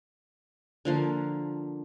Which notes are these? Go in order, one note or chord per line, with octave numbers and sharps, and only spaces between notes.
D3 F3 A#3